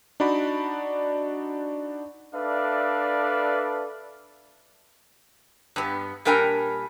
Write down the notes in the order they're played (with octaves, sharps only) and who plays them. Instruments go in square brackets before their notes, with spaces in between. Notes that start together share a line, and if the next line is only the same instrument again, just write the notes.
[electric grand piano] D4 D#4 F#4 D5 B5
[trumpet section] D4 A4 B4 D5 E5 F5
[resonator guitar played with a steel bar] G2 B3
A#2 G3 D4 A#4 G5 G#5